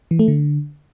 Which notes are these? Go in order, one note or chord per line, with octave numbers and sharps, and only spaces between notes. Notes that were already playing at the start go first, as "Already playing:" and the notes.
E3
A3
D3